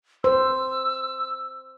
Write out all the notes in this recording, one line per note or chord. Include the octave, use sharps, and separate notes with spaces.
C5 E6